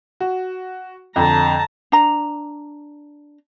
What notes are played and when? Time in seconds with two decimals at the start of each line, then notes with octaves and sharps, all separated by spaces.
0.20 F#4
1.16 F2 D3 A5 A#5
1.92 D4 A#5